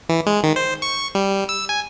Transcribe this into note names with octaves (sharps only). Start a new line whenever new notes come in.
E3
G#3
D#3
C5
C#6
G3
E6
G#5